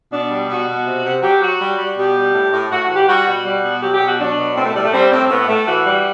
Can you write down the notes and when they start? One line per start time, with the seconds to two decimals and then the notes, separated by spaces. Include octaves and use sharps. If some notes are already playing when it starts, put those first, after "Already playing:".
0.12 B2 D4
0.31 G3
0.49 B2 F#4
0.67 B2
0.86 C3
1.04 C3
1.23 F#3 G4
1.41 F#3 F#4
1.60 G3
1.78 G3
1.97 B2 G4
2.15 G3
2.34 A2
2.52 A2
2.71 A2 F#4
2.84 E3 F#4
2.95 G4
3.08 G3 F#4
3.26 B2 F#4
3.45 G3
3.64 B2
3.82 F#3 G4
3.94 G4
4.01 B2
4.07 F#4
4.19 F#3 D4
4.38 B2
4.56 A2 C4
4.65 A3
4.74 A2 G3
4.84 A3
4.93 G3 C4
5.11 A2 C4
5.30 A2 B3
5.48 A2 A3
5.67 E3 F#4
5.86 G3